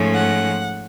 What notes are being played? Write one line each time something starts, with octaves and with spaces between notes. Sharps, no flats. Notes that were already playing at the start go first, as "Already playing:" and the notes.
Already playing: G#2 F3 A3 C#4
F#5